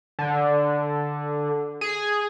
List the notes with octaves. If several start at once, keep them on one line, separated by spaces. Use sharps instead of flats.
D3
G#4